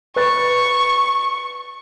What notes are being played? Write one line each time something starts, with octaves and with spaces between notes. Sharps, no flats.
B4 C#6 F#6 A6